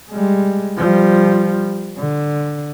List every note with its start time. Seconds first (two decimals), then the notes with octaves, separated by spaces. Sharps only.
0.11 G3 G#3
0.77 F3 G3
1.98 D3